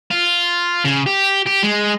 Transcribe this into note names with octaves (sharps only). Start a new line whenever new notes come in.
F4
C#3
G4
G4
G#3